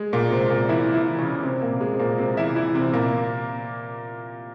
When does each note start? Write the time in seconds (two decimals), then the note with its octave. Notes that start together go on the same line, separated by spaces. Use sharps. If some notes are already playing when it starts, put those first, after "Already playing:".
Already playing: G#3
0.13 A#2 A#3
0.31 C3 C4
0.50 A#2 A#3
0.69 E3 E4
0.94 E3 E4
1.18 C#3 C#4
1.43 C3 C4
1.62 A#2 A#3
1.81 G#3
1.93 C4
1.99 A#2 A#3
2.18 C3 C4
2.37 E3 E4
2.56 E3 E4
2.75 C3 C4
2.93 A#2 A#3